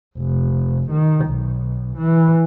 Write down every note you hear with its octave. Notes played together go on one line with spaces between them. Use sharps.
F1
D#3
B1
E3